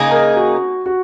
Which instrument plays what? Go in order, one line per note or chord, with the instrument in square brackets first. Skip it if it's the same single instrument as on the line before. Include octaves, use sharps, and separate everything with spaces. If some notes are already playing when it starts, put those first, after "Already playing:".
Already playing: [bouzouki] C#3 A#3 D#4 G#4
[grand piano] A#4
F#4
F#4